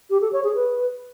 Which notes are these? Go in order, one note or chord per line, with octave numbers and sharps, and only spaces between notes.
G4
A4
C#5
G#4
B4